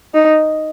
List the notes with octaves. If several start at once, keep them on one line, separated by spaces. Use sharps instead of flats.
D#4